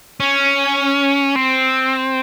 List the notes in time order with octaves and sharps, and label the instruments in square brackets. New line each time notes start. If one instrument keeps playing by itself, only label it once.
[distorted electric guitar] C#4
C4